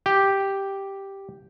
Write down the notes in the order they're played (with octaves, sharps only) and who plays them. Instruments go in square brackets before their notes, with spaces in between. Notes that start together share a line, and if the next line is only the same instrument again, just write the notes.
[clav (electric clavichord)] G4